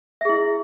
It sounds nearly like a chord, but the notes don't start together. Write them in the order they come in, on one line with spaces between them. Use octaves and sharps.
E5 G#4 E4